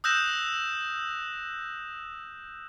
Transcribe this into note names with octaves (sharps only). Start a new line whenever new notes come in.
D#6 E6 F#6 G6 A#6 E7